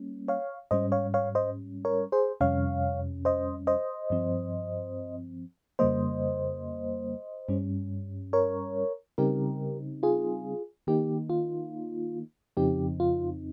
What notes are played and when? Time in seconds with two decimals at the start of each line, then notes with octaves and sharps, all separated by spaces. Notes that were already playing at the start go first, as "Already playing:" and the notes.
Already playing: G3 A#3 C#4
0.28 C#5 F5
0.71 G#2 G3 C#4 C5 D#5
0.92 C#5 F5
1.14 C#5 F5
1.35 C5 D#5
1.85 A#4 C#5
2.12 G#4 C5
2.40 F2 C3 G3 C#4 C#5 F5
3.25 C5 D#5
3.67 C5 D#5
4.10 G2 F3 C4
5.79 F2 C#3 G3 A#3 C5 D#5
7.49 G2 G3 C#4
8.33 A#4 C#5
9.18 C#3 G3 C4 D#4 G4 A#4
10.03 F4 G#4
10.87 D#3 A#3 D#4 G4
11.30 F4
12.57 F2 C#3 F3 C4 D#4 G4
13.00 F4